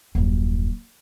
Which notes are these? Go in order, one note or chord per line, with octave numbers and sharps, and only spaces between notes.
D#1 F#2